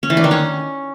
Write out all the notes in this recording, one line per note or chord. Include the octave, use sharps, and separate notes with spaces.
C#4
E3
D4
D#3
C#4